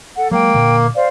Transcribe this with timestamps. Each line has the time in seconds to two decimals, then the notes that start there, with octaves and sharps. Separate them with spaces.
0.16 A4 F#5
0.31 F#3 G#3 A#3 G5
0.54 A#2 D3
0.95 C5 D5 F5